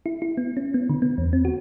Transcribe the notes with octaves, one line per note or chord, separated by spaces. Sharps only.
E4
E4
B3
C#4
B3
D3
B3
E2
C4
F#4